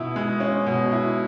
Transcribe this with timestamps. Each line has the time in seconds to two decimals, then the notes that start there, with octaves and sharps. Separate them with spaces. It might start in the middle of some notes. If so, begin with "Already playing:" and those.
Already playing: B2 E4
0.16 G#3
0.40 C#4
0.66 B2
0.92 E4